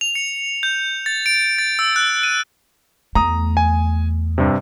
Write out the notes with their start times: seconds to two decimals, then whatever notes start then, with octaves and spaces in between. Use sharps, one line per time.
0.01 F7
0.15 C#7
0.63 G6
1.06 A6
1.26 D7
1.58 A6
1.79 E6
1.96 F#6
2.23 D#7
3.15 E2 A3 A#5 D#6
3.57 G#5
4.38 G2 C3